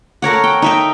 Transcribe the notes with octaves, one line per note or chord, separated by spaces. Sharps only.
A4 A#4 C#5 F#5
G5
D#4 E5 G5